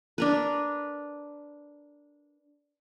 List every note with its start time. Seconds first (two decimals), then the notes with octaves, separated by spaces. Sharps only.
0.18 D4 A#4 B4